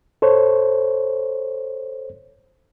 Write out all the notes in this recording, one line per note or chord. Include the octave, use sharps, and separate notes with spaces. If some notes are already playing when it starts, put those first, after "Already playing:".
A4 C5 C#5